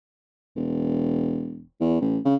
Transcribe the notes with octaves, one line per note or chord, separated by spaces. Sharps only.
E1
E2
A1
C#3